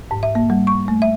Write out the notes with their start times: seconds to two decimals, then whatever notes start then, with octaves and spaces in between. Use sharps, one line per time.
0.11 G#2
0.23 E5
0.35 A#3
0.50 G3
0.67 C#6
0.88 A3
1.02 E5